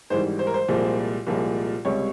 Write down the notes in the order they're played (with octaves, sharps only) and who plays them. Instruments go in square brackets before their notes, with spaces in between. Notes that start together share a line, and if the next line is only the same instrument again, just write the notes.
[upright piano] G#1 G#2 E3 G3 C5
C5
A#4
C5
C2 A#2 F3 G#3
C2 A#2 F3 G#3
C#2 C3 G3 C#5